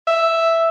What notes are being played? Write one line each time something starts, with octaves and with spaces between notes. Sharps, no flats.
E5